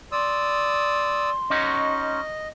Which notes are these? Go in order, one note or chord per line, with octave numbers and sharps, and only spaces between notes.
D5 C6 D#6 E6
C#4 D#4 F#4 D#5